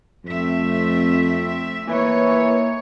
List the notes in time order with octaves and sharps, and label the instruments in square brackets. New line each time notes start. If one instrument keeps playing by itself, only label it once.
[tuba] F2 [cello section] A3 C4 E5
[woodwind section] E3 [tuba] A#3 [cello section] D#4 C#5